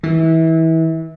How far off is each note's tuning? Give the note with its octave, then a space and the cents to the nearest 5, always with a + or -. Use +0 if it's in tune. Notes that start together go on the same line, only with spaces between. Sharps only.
E3 -30